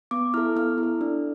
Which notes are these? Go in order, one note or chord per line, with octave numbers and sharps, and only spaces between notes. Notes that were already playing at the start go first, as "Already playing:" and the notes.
B3 D6
E4 A4 F6
B3 F6
E4
A4
D4